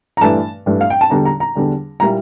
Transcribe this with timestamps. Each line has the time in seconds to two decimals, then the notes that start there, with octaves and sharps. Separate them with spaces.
0.17 A#5
0.21 G2 E3 A3 D4 A5
0.66 G2 E3 A3 D4
0.81 F5
0.90 G5
1.01 A5
1.10 E2 D3 G3 D4 A#5
1.25 A#5
1.40 A#5
1.55 E2 D3 G3 D4
2.00 A#2 G3 A#3 E4 A#5